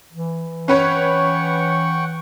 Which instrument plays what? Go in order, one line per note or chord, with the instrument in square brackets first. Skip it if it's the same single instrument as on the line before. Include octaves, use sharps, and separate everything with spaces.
[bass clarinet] E3
[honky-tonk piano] C#4 B4 C#5 [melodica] F#5 G5 C#6